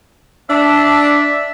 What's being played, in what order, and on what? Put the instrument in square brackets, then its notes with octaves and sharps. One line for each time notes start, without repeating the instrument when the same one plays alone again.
[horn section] D4 [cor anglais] E5